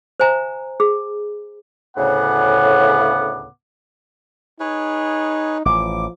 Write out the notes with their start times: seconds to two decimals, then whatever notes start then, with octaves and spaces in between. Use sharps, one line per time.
0.20 C5 E5 G#5 A#5
0.80 G#4
1.98 D2 A2 C#3 B3 F#5 D6
4.60 D#4 G#4 B4 C#5
5.65 A1 F3 D6